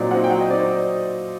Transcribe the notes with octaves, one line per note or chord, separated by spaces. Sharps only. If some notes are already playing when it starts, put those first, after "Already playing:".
Already playing: A#2 F#3 C4 D#4 D5
F#3 C4 D#4 F#5
G5
F#3 F#5
D#5
C4 D#4 D5
C5